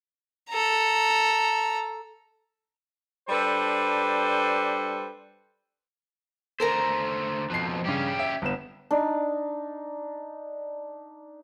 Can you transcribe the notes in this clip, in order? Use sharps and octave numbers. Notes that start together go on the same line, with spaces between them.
A4 A#5
G3 D4 A4 B4 C5
D3 A3 A4 A#4 C5 A#5
F2 B2 F3 F#6 C7
G2 C#3 C#4 G4
E5
G1 B3 E7
D4 D#4